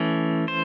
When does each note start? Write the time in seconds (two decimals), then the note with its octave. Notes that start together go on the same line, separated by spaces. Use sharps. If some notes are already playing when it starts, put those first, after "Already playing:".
Already playing: E3 A3 C#4
0.48 C5